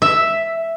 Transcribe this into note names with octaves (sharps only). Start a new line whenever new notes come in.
E5